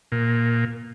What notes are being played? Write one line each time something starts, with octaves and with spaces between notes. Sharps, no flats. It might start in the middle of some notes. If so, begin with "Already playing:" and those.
A#2